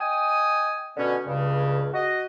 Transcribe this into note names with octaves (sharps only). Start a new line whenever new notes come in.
D#5 G5 G#5 D#6
B2 D3 C#4
C#2 G2 C#3
F#4 D#5